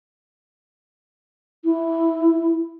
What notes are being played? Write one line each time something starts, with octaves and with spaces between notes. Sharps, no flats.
E4